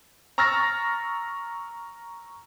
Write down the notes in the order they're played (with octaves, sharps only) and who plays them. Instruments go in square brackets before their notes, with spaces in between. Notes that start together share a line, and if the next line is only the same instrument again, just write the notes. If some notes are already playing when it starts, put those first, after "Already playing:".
[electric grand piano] A#5 C#6 E6 F6 A6 A#6